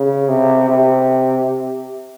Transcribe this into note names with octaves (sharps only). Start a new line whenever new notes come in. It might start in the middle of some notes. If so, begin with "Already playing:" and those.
Already playing: C#3
C3
C3